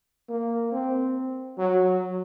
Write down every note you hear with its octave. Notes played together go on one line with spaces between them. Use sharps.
A#3
C4
F#3